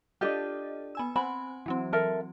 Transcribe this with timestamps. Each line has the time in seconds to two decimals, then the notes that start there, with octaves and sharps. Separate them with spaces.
0.21 D4 D#4 F4 G4 A4 D#5
0.95 B3 G#5 E6
1.16 C4 F#5 G#5 B5
1.66 E3 F#3 C4
1.93 A4 A#4 E5